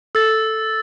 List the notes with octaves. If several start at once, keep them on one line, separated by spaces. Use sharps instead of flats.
A4 E6 A6